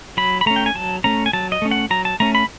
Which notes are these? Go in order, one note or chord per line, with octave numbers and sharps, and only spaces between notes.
F#3 B5
B5
A3 C#4 A#5
G5
G#5
F#3 A5
A3 C#4 A#5
G#5
F#3 A5
D#5
A3 C#4
F#5
F#3 A#5
A5
A3 C#4 A#5
B5